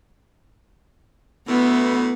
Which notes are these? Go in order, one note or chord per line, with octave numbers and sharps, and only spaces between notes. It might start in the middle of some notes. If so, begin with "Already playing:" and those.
D2 A2 E3 B3